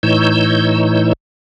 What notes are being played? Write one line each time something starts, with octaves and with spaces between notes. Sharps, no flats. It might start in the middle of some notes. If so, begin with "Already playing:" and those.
A2 E3 D#4 C#5 E6 G6